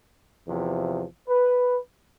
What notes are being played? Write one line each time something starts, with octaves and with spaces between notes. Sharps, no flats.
E2 C3 F3
B4